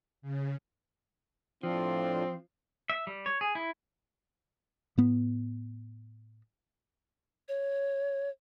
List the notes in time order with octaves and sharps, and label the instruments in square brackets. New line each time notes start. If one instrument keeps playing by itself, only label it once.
[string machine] C#3
[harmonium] A2 D4 F4 [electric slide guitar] F3 [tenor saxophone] C4
[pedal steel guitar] E5
G3
C#5
G#4
E4
[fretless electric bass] A2 B3
[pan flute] C#5